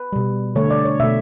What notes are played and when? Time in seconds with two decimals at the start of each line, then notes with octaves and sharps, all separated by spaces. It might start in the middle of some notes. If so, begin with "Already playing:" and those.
Already playing: B4
0.13 B2 G3
0.56 D3 A3 C#5
0.70 D5
0.85 C#5
1.00 B2 A3 E5